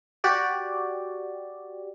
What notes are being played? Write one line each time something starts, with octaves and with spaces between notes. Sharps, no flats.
F#4 G4 D5